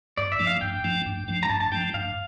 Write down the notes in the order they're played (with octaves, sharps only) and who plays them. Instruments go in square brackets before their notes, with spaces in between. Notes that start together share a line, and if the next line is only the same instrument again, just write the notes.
[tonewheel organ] G2 [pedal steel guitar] D5
[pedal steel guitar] E5
[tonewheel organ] F3 A3 D4
[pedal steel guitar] F5
[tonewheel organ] G2 [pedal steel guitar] G5
[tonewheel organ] F3 A3 D4
G2
F3 A3 D4
[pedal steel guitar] A#5
[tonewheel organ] G2 [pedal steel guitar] A5
[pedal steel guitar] A5
[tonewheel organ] F3 A3 D4 [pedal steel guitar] G5
[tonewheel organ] G2 [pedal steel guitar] F5